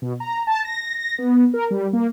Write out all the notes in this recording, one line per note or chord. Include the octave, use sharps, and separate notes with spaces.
B2
A#5
A5
A#6
A#6
B3
A#4
G3
A#3